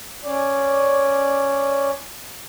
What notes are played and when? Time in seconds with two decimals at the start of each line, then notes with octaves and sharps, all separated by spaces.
0.24 C#4 D5